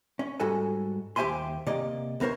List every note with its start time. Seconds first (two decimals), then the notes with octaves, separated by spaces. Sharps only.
0.19 C#4
0.40 G#2 G3 F#4 A4 G#5
1.16 D#2 G4 C5 E5 G#5 C6
1.67 C3 A#3 D5 D#5
2.20 D2 B3 A#4 C5 C#5